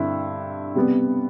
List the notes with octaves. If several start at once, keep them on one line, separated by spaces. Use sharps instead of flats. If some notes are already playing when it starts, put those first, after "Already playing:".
Already playing: G2 D3 C4 E4
C3 G3 B3